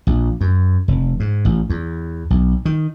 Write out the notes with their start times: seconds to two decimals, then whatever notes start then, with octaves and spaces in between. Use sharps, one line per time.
0.07 A#1
0.41 F#2
0.88 F1
1.20 G#2
1.45 A1
1.70 E2
2.30 B1
2.65 D#3